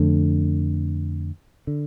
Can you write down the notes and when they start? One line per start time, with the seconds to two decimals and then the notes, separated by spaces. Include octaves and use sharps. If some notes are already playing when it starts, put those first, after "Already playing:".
Already playing: F2 D3 A3
1.67 D3